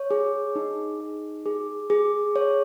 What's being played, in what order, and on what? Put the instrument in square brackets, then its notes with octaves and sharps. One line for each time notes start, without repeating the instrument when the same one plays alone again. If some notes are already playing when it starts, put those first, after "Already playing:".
Already playing: [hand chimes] C#5
G#4
D#4
G#4
G#4
G#4
C#5